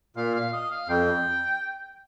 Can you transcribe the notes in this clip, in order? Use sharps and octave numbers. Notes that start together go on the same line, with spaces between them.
A#2 F5
F5
D#5
F5
F2 G5